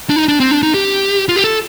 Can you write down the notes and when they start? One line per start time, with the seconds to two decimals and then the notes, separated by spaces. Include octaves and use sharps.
0.10 D4
0.16 D#4
0.28 D4
0.40 C4
0.51 D4
0.63 D#4
0.74 G4
1.29 F4
1.36 G4
1.44 A4